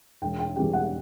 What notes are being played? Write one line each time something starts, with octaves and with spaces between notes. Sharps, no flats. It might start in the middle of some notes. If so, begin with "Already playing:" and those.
E1 G5
G5
E2 C3 E3 G3 G5
F#5